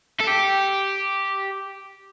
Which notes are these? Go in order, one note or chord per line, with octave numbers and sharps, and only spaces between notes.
A4
G4